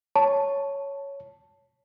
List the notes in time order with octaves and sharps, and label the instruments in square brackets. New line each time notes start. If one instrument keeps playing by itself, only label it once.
[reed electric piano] C#5 [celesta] A5